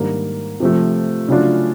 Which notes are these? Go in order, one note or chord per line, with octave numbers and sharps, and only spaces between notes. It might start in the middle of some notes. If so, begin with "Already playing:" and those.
Already playing: G#2 D#3 G3 A#3 D4
C3 F3 A3
C#3 F#3 A3 D4 F4